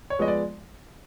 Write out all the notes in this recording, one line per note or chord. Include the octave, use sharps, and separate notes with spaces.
C#5
F3 G#3 B3 D#5
D5